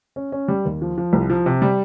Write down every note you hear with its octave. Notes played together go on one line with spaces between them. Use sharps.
C#4
C#4
G3
D#2
F3
F3
C2
F3
C3
G3